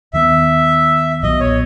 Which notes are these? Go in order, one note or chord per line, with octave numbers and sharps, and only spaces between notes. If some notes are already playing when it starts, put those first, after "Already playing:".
D#2 D#3 G#3 B3 E5
B1 A#2 F#3 B3 D#5
C#5